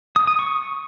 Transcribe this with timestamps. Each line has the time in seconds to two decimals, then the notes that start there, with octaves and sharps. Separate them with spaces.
0.16 D#6
0.27 D#6
0.39 C#6